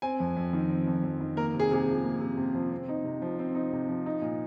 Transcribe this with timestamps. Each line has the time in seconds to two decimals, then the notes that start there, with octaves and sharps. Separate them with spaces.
0.02 C4 G#5
0.20 F2
0.37 F2
0.53 D#3
0.70 C4
0.87 F2
1.04 F2
1.20 D#3
1.37 A#3 A#4
1.54 C3
1.59 G#4
1.71 C3 G#4
1.88 F3
2.04 A#3
2.21 C3
2.37 C3
2.55 F3
2.72 C4
2.88 D#4
3.04 C3
3.22 F3
3.39 C4
3.55 D#4
3.72 C3
3.88 F3
4.06 D#4
4.22 A#2